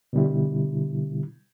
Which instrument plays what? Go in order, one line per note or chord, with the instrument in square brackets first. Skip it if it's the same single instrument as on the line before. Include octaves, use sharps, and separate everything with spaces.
[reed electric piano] B2 D3 G3 E4